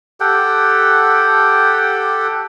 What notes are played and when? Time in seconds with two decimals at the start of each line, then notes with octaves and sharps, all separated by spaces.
0.20 G4 A4 F#5 G5